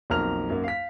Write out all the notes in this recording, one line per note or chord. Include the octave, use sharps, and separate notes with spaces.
B1 F2 A#3 A#5 F6 F7
F#2 A#3
F5 B6